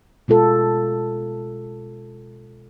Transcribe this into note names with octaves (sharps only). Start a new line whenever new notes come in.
B2 G#3 F4 A4